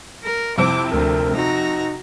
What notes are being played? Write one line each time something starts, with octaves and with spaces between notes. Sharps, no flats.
A#4
F2 C3 C4 E4 D6
D2 A#4
D#4 F#4 A#5